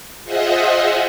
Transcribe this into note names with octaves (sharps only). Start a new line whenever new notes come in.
F4 G#4 C5 D#5 E5 F#5